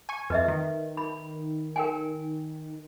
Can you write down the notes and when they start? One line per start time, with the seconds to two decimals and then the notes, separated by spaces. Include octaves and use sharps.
0.09 G#5 C#6
0.30 F2 B4 D#5 E5
0.48 D#3
0.97 B5
1.76 A#4 G5 G#5